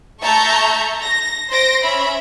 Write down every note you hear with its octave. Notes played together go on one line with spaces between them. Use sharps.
A3 E5 A5 A#5 C#6 G6
A#6
C5 C6 A#6 D7
C#4 E5 B5